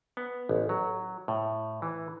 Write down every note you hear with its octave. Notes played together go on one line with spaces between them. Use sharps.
B3
A1
F#3
A2
E3